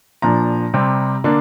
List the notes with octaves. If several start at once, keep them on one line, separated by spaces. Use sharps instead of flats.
A#2 F3 D4 A#5
C3 G3 C4
D3 A#3 D4